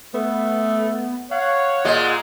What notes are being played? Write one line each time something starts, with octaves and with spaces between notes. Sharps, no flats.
A3 B3
C#5 F5 F#5
A#2 G#3 D#5